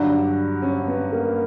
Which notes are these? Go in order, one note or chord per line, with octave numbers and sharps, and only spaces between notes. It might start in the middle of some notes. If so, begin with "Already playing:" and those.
Already playing: G2 D3 F#3 D4
C#4
B3
A#3